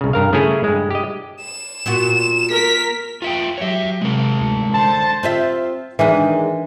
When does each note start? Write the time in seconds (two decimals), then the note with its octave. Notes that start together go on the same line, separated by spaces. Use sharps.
0.01 C2 C#3
0.13 G2 A#4 F5
0.33 C#3 A3 C#4 E4 G#4 C#5
0.64 G2 G#3
0.91 G4 D#5
1.41 E7
1.86 A#2 B3 F#4
2.51 A#4 B6
3.22 F4 E5 G5
3.58 F#3 G4 C#5 E5
4.02 C3 G#3 A#4
4.40 D2
4.74 D3 C5 A5
5.23 C4 F4 E5
5.99 D#3 E3 G#3 D4